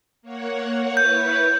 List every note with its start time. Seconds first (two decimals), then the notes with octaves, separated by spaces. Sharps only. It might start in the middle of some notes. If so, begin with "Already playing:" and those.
0.22 A#3 C#5 F#5
0.97 E4 B4 C#5 G6